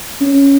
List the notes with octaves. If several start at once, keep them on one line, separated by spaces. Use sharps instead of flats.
C#4